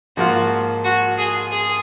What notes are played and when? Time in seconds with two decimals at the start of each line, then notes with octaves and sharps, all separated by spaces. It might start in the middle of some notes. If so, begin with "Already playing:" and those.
0.17 G#2 F3 A#3 F4 F#4
0.84 F#4
1.18 G#4
1.52 G#4